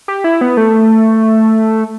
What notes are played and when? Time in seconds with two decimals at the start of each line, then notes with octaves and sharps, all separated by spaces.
0.08 G4
0.24 E4
0.41 B3
0.57 A3